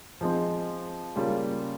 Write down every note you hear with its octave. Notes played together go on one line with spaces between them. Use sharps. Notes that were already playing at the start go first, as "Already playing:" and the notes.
F3 G#3 C4
C#3 G3 A#3 F4